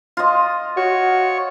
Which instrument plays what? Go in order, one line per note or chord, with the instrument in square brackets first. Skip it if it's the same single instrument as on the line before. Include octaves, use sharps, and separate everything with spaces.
[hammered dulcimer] F4 D#5
[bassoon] F#4 [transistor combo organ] C#5